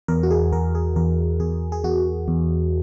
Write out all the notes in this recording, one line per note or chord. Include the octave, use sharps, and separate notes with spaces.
E2 A#4
F#4
G#4
E2 A#4
G#4
E2 A#4
E2 G#4
G#4
E2 F#4
E2